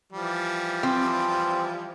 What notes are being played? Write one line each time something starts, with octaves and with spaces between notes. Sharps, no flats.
E3 F3 G3
C4